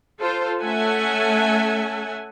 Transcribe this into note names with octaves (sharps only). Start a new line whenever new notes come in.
F4 A4 C5
A3 C#4 A4 E5 F#5 G#5